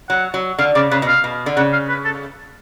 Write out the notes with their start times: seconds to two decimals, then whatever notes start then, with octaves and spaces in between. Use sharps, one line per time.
0.10 F#3 F#5
0.34 F#3
0.59 D3 F5
0.75 C#3 D5
0.91 C#3 B4
1.02 B2
1.07 F5
1.24 B2
1.46 D3
1.57 C#3 F#5
1.73 F5
1.89 B4
2.05 A4